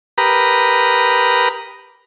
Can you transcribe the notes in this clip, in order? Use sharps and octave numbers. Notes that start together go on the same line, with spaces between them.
G4 A#4 B4 A#5 B5 D#6